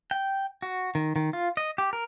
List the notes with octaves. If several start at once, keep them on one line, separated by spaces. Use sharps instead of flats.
G5
F#4
D#3
D#3
F4
D#5
G4
A#4